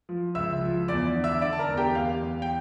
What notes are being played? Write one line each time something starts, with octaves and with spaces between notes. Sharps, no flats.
F3
C#2 E5 E6
F3
E2 D5 D6
D3
E5 E6
D3 D5 D6
A5
A#4 A#5
E2
G4 G5
E2 F5
E2
G5